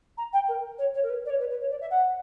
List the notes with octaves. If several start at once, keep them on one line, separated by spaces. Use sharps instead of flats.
A#5
G5
A#4
C#5
C#5
A#4
B4
D5
C#5
B4
B4
C#5
D5
E5
F#5